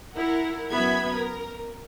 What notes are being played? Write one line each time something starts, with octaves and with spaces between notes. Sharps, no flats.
E4 A#4 F#5
F#2 B3 E5 B5 G#6
A#4